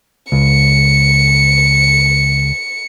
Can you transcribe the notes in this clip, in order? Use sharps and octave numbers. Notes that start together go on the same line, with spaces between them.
C#2 C#7